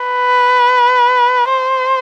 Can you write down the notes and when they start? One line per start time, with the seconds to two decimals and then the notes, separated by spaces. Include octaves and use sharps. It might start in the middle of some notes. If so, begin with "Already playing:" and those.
Already playing: B4
1.49 C5